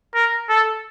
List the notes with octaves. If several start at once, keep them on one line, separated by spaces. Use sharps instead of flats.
A#4
A4